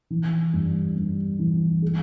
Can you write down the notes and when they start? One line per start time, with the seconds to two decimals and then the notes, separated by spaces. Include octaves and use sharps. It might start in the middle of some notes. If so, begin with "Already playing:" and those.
0.10 E3
0.53 G2
0.96 G2
1.39 E3
1.82 G#3